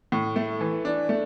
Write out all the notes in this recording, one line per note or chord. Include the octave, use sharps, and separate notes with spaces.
A2
A3
E3
D4
A3